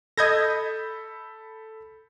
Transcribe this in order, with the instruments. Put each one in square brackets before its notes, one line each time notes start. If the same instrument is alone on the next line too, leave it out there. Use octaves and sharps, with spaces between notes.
[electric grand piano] A4 B5 G6 [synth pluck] D#5 G#6 A#6